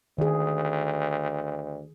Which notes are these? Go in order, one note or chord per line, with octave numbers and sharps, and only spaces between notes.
D2 D#3 G#4